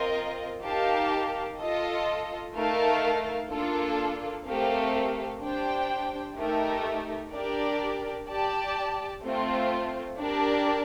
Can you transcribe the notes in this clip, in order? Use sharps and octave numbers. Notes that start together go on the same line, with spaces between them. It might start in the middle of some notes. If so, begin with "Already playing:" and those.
Already playing: C4 F4 A#4 D#5
D#4 G4 A#4 F5 A5
F4 A4 D#5
A3 D#4 A#4 F5 A5
A#3 D4 F4 A4
A3 C4 G4 A#4 F5
D4 G4 C5 G5
A3 D#4 G4 A#4
D4 G4 A#4 D5
G4 D5 A5
A3 C4 F4
D4 G4 A#4 D5 A5